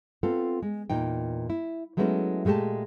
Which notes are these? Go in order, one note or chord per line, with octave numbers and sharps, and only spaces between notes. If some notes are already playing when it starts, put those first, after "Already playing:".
B3 C4 F4 A4
G#3
E2 A#2 D#4 G5
E4
F#3 G#3 A3 B3 C#4 E4
A#2 G#3 A3 G4 A5